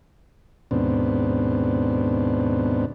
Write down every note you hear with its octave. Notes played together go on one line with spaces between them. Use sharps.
D#2 G#2 B2 B3 C4 D4